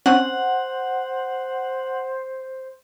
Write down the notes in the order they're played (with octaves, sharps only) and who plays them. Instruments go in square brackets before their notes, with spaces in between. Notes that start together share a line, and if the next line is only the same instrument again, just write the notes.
[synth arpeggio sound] C4 C#4 [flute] C5 [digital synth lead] F#5